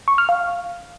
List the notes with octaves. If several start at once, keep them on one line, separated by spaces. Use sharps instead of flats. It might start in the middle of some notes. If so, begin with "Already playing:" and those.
C#6
F6
F5